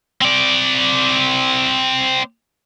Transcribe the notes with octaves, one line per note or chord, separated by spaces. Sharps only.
C4 D5